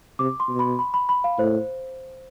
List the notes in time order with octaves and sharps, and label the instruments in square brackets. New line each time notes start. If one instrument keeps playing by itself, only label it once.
[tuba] C3 [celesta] D6
[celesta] C6
[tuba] B2
[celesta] B5
B5
B5
B5
F5
[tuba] A2 [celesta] C5